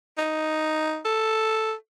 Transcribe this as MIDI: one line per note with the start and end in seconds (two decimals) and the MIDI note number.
0.18 1.00 63
1.05 1.74 69